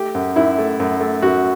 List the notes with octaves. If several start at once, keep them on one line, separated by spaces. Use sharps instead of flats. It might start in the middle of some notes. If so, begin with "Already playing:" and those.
Already playing: A3 G4
F#2
F#2 E4
A3
F#2
A3
F#2 F#4